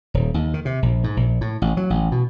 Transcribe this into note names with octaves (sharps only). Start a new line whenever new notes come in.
D#1
D#2
D#3
C3
A#1
G#2
A#1
A2
A1
F#3
A1
B2